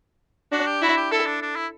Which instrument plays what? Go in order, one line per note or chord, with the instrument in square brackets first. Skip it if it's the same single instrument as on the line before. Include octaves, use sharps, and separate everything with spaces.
[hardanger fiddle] D4 [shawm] F#4
[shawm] G4
[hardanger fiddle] E4 [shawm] F#4
[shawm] G4
[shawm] E4 [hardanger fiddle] A4
[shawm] D4
D4
E4